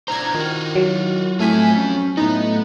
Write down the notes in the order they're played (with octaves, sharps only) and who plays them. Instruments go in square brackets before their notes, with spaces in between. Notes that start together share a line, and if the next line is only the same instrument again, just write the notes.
[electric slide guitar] B2 D4 C5 [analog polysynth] A#5 G#6
[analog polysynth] D#3 [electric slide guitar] F4 F#4
[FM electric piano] F#3
[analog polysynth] A2 G#5 B6 [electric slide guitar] C4 F4
[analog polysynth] C#4
[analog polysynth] A2 D#4 [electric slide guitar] B3